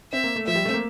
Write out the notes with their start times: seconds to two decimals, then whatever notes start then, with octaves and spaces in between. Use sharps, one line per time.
0.12 C4 E5
0.24 A#3
0.36 A3
0.47 F3 E5
0.55 G3
0.65 A3 C4
0.74 A#3